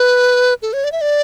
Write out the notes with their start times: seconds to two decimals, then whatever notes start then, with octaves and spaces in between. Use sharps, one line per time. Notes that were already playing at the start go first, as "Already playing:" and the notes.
Already playing: B4
0.62 A4
0.73 C#5
0.84 D5
0.92 E5
1.01 D5